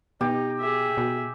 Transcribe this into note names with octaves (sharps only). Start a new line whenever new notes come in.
B2 D#4 G4
G#4 E5
B2